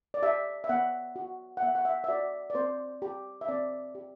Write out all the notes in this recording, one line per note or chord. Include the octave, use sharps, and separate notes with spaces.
D5
G4 E5
E5
B3 F#5
F#4
F#5
B3 E5
F#5
E5
E5
F#4 D5
D5
C4 C5
G4
E5
C4 D5
G4